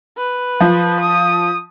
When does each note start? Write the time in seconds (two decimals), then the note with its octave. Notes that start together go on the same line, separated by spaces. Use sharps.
0.18 B4
0.60 F3
1.00 D#6